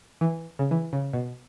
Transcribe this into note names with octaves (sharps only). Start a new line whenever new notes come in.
E3
C#3
E3
C#3
B2